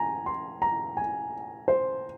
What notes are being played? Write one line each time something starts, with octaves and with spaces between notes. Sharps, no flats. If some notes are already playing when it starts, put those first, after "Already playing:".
Already playing: G#5 A#5
C6
A#5
G#5
C5